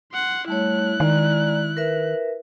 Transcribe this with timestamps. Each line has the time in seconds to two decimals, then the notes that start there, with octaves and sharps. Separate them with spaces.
0.13 F#5 C6
0.48 G3 A3 E4 C#5 F#6
1.00 D#3 G#3 D5 A#5
1.77 A#4 B4 E5